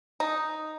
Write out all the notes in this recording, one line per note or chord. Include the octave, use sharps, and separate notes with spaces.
D#4